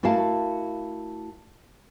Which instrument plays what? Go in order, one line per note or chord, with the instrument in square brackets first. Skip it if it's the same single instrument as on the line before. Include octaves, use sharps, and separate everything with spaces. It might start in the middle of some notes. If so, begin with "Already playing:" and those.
[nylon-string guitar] A3 E4 F#4 A#4 F5 A5